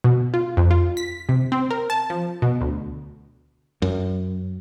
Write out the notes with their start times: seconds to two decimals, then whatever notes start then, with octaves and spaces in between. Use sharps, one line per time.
0.04 B2
0.34 F4
0.57 F2
0.71 F4
0.97 B6
1.29 C3
1.52 C4
1.71 A#4
1.90 A5
2.10 F3
2.42 B2
2.61 D2
3.82 F#2